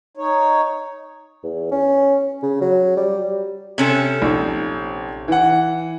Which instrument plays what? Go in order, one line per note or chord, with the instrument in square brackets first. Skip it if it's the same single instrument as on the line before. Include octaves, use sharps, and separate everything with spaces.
[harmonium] D#4 C#5
[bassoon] E2
C#4
C#3
F#3
G3
[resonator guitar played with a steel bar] C3 C#4 A4
[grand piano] A#1 D#4
E3 F#5